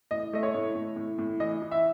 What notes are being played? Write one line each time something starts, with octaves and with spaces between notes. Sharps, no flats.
A2 D#5
A3 D#5
C#5
A2
A2
A2
A2
E3 D#5
E3
E5